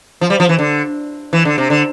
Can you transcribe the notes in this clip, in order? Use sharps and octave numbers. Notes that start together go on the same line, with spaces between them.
F3
G3
F3
E3
D3
E3
D3
C3
D3